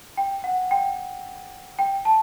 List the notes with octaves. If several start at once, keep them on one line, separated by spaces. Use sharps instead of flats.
G5
F#5
G5
G5
A5